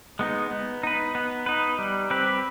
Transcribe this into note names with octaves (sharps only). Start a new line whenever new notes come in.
G#3 B3 D#4
B3
D#4 B4
B3
D#4 B4
G3
C4 G4 B4